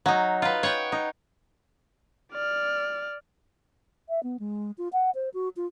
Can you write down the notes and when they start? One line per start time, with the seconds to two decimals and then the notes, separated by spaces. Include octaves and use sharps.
0.06 F#3 D#4
0.42 F4 B4
0.63 C#5 F#5 G5
0.92 D#4
2.32 D5 F6
4.09 E5
4.23 B3
4.39 G#3
4.78 F4
4.93 F#5
5.15 C5
5.34 F#4
5.57 F4